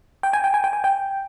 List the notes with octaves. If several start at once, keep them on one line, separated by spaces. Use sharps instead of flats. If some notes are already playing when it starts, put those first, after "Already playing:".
G5
G#5
G5
G#5
G5
G#5
G5